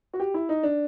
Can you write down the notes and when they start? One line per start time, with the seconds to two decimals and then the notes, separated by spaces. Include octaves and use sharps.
0.14 F#4
0.20 G4
0.34 E4
0.49 D#4
0.63 D4